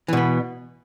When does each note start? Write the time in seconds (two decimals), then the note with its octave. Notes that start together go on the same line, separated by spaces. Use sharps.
0.08 E3
0.13 B2
0.17 B3